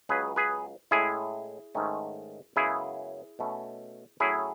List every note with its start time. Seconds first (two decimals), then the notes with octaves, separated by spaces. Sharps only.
0.09 C#2 C#3 F#3 G#4 B4
0.36 G#4 B4
0.91 A2 G#3 C#4 E4 G#4
1.75 G#2 D#3 A3 C#4
2.56 F#2 C#3 G#3 B3 E4 G#4
3.39 B2 A3 C#4
4.20 A2 F#3 C#4 E4 G#4